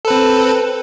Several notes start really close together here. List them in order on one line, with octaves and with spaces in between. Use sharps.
A4 B4 C4